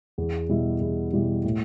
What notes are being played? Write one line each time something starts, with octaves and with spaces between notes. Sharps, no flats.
E2
B2 G3 E4
E2
B2 G3 E4
A2